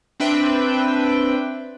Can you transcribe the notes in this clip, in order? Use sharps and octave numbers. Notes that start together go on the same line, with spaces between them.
C4 D4 B4 E5 G5